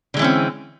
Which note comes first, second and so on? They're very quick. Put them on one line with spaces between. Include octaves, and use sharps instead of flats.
D3 G#3 E3 C#4 C4